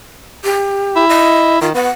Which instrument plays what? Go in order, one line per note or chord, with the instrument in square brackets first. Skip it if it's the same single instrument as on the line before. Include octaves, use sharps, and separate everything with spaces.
[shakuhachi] G4
[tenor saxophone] E4
[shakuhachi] D#5
[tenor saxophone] D#3 [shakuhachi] F4
[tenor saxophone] B3 [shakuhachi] F#5